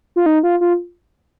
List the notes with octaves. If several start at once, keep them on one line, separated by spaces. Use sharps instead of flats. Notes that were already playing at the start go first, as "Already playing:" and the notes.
F4
D#4
F4
F4